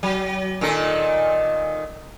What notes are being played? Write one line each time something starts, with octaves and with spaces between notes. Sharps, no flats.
F#3
A#2 D#3 A4